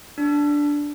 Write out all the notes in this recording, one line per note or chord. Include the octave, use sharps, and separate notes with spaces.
D4